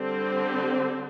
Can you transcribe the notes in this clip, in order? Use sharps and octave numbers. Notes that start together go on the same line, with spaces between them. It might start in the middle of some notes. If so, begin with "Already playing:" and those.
Already playing: D3 G3 C4